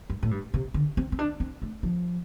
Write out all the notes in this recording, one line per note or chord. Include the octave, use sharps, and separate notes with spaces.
G2
A2
G2
C3
D3
C4
C4
D4
C4
A3
F3